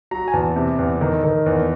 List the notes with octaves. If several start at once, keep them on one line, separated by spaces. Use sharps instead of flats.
F#3 A#5
G#5
E2 A5
C3
E2
D#3
D#3
E2